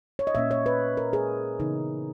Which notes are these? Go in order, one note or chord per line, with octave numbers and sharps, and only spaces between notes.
C#5
D#5
A#2 A#3 C#4 E5
C#5
B4
A#4
G#4
C#3 E3 B3 D#4